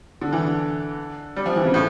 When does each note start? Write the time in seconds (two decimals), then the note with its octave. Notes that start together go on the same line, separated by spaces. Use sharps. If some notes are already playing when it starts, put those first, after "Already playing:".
0.21 D3
0.33 E3
0.45 D3
1.36 G3
1.46 F3
1.56 E3
1.65 C#3
1.74 A2